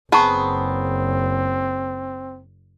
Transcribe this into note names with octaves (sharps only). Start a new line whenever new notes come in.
F#1 B3 C4 G#4 A5 A#5 C#6